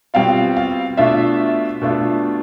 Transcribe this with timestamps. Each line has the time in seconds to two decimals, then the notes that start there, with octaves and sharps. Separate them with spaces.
0.14 B2 G3 C4 F4 F5
0.57 F5
0.97 B2 A3 D4 F4 E5
1.82 B2 A3 D4 F4